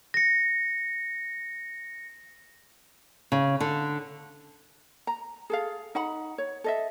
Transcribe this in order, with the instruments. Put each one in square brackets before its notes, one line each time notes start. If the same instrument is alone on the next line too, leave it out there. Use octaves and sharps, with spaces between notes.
[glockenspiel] A#6 C#7
[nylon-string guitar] C#3
D3
[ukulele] A#5
G#4 A4 F5
D#4 F#5 B5
C#5
A4 D#5 E5